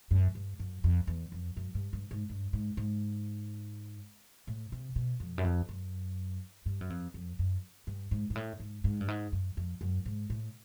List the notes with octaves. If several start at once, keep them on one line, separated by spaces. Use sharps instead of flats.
F#2
G2
F#2
F2
E2
F2
F#2
G2
G2
G#2
G2
G#2
G#2
A2
C3
B2
F2
F#2
F2
F#2
G2
F#2
F2
F2
F#2
G2
G#2
G#2
A2
G#2
G#2
G2
G#2
F#2
F2
F#2
G#2
A2